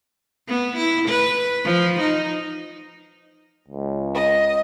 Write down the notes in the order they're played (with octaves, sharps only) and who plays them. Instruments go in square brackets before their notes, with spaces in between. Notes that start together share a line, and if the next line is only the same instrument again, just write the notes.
[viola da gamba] B3
E4
B4
F3
D#4
[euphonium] C#2
[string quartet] D#5